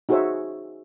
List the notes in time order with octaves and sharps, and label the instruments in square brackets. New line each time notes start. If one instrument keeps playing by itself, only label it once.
[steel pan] D#4 F#4 G#4 C5 C#5 E5